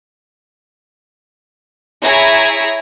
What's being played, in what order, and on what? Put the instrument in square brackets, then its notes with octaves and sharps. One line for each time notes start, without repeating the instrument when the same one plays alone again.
[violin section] E4 G#4 C#5 E5 A#5